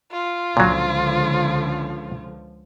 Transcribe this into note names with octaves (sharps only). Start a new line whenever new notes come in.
F4
C#2 A#2 D3 F3 F#3